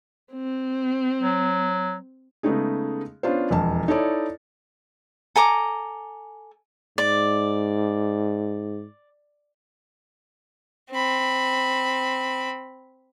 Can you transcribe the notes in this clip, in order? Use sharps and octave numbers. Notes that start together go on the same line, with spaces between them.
C4
F#3
C#3 G#3 A3 B3 D#4 G#4
B3 C#4 D4 F4 C5
E1 F2 A5
D#4 E4 A4 C#5 D5
A4 G#5 A#5 D6
G#2 D5
C4 B5